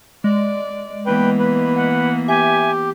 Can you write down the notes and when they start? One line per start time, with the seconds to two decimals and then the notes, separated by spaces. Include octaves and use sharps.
0.24 G#3 D5
1.06 E3 A#3 B3 B4 G5
1.39 B4
1.75 F#5
2.28 G4 E5 G#5